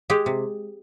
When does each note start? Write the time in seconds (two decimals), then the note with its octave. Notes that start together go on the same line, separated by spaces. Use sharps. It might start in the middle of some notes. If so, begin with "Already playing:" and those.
0.10 G#3 G4
0.26 C3